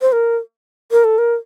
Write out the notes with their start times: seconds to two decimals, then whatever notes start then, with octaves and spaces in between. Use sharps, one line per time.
0.02 C5
0.12 A#4
0.92 A#4
1.05 A4
1.18 A#4